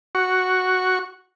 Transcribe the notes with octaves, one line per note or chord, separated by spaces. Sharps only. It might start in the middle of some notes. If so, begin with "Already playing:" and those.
F#4 C#6